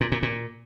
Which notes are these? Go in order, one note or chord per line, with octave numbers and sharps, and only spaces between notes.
A#2
A#2
A#2